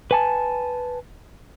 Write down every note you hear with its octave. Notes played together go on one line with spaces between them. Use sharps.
B4 G#5 A5